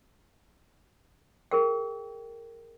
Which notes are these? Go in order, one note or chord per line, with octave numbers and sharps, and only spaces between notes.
G#4 A#4 G5